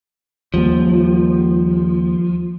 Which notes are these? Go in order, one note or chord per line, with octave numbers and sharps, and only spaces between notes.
D#2 F3 G3 A#3